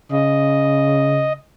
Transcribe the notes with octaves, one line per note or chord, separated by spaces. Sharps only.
C#3 D#5